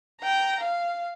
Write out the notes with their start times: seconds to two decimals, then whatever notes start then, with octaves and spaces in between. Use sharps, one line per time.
0.21 G5 A#5
0.61 F5